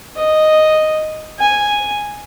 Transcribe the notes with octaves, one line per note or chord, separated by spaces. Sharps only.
D#5
G#5